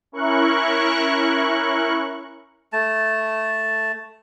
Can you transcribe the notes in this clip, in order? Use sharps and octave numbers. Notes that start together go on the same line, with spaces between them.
C#4 E4 A#4 C#6 F#6
A3 A5